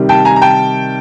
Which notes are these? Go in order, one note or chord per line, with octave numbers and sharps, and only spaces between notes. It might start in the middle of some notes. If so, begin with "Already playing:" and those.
Already playing: C3 D#3 G3
G5 A5
G#5 A#5
A#5
G5 A5